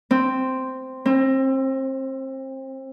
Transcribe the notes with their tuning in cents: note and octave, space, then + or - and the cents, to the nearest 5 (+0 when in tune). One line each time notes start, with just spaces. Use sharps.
C4 -5
C4 +30